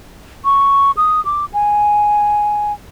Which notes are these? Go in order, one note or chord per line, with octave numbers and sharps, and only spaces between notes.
C#6
D#6
D6
G#5